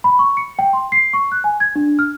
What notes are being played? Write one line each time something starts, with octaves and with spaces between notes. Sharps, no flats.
B5
C#6
C#7
G5
C6
C7
C#6
F#6
G#5
G#6
D4
F6